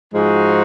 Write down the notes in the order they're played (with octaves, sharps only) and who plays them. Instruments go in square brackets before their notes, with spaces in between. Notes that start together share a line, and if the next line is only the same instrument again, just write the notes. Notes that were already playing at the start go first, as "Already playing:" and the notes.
[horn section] G#2 F3 G#3 D#4 F#4